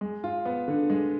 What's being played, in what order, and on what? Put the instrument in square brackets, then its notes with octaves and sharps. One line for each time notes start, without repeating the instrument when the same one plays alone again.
[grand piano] G#3
F4
B3
D3
G#3